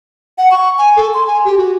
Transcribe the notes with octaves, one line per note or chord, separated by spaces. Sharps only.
F#5
C#6
G#5
A4
C6
G#5
G4
F#4